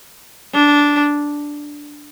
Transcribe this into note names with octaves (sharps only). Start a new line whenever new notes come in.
D4